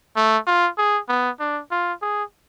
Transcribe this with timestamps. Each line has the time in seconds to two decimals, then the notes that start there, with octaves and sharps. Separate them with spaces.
0.16 A3
0.47 F4
0.78 G#4
1.08 B3
1.40 D4
1.71 F4
2.02 G#4